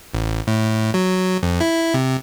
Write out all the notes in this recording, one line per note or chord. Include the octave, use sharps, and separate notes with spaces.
A1
A2
F#3
F2
E4
C3